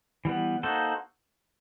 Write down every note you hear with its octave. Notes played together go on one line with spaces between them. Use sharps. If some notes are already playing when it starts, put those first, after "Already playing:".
E3 G3 B3
A#3 D#4 F#4 A4 C5